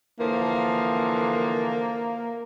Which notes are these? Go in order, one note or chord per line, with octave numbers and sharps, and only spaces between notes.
D3 E3 F3 A#3